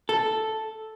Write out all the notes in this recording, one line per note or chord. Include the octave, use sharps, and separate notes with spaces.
A4